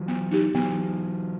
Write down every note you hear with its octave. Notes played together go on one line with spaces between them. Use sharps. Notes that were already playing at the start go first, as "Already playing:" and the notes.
Already playing: E3 F#3
B3
D#4 G4
E3 F#3 B3